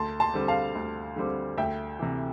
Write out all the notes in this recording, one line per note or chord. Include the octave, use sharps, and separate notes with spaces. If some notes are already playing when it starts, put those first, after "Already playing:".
Already playing: D2 A5 C6
A5 C6
D3 G3 C4
F5 A5
D2
D3 G3 C4
D2 E5 G5
C3 E3